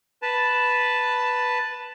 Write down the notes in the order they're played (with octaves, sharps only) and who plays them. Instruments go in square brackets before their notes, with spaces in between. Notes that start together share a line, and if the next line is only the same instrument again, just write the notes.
[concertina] B4 A5